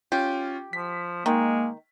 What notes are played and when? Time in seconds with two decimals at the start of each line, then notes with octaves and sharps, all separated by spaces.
0.12 C#4 F4 G4
0.73 F3 B6
1.26 D#3 G#3 A#3